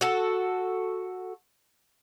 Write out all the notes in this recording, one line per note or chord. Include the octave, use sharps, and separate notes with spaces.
F#4 A4